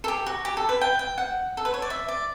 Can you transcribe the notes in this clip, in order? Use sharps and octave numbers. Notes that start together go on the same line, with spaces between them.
A4
G4
F#4
G4
A4
B4
G5
G5
F#5
A4
B4
C#5
D5
E5
D5